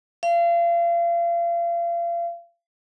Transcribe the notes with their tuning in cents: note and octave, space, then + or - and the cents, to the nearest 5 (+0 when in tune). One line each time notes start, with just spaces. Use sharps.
F5 -35